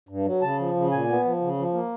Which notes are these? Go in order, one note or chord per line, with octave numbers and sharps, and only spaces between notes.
G2
F#3
C#3 A5
F3
C#3
A#2 G#5
B3
F3
C#3
F3
A#3